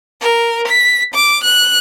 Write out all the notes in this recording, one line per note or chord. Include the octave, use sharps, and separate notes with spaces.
A#4
B6
D6
F#6